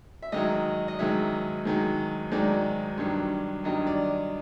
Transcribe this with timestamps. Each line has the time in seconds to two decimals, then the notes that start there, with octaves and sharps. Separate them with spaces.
0.22 E5
0.32 G#2 D#3 F#3 D#5
0.88 D#5
0.99 G#2 D#3 F#3 E5
1.65 G#2 D#3 F#3
2.32 G#2 D#3 F#3 D5
2.98 G2 D#3 F#3
3.64 G2 D#3 F#3 D#5
3.87 D5